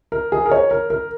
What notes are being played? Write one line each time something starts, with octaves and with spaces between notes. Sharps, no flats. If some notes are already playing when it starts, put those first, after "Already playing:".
A#4
G#4
A#4
C#5
A#4
A#4